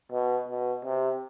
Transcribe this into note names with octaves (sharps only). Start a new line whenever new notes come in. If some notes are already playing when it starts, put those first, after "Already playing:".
B2
B2
C3